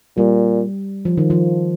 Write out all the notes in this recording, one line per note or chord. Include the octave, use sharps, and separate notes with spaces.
A#2 G3
F3
D#3
F3